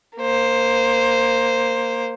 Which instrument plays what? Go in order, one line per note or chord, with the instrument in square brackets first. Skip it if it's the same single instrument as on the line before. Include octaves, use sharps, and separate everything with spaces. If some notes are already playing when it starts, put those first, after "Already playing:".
[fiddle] A#3 C5